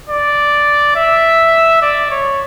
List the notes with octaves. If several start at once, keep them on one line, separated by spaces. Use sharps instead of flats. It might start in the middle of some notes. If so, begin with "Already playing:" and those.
D5
E5
D5
C#5